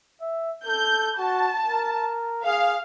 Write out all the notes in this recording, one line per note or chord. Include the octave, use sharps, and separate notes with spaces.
E5
A4 G6
F#4 A5
A#4
G#4 F5